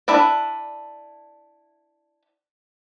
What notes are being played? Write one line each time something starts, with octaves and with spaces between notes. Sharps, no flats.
D4 E4 B4 D5